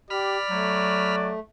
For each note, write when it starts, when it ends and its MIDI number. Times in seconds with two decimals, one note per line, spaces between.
0.10 0.37 67
0.10 1.35 74
0.10 1.16 83
0.10 1.16 89
0.50 1.33 54
0.50 1.40 57